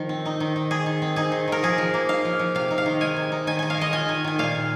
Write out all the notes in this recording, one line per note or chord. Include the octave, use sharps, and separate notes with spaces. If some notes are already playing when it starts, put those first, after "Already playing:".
Already playing: D#3 F3
C4
D#4
D#3
D#3
D#3 G#4
D#3
C4
D#4 G#4
D#3
D#3 A#4
F3 G#4
F3
A#3
D#4 F5
F3
F3
C3 F5
D#4
F5
D#3
G#3 G#5
C3
D#4
D#3 G#5
D#3 G#5
F5
G#3 D#5
F4 G#5
D#3
D#3 G#5
A#2 F5
A#2